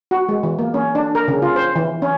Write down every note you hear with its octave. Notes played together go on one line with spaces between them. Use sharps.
F#4
G#3
E3
A#3
C#4
D4
A#4
C#3
F4
C5
E3
C#4